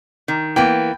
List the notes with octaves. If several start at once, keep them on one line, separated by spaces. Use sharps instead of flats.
D#3
E3 A#3 B3 G5